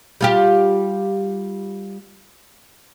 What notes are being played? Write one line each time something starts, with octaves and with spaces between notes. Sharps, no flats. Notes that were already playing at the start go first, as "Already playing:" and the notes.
G3 F4 G4